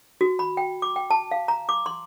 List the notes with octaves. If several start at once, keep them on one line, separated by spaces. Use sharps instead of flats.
F#4
B5
G5
D6
G5
A5
F5
A#5
D6
C6